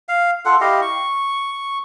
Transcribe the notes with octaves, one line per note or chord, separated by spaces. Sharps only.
F5
F4 A4 F#5
E4 G4 D#5 F5
C#6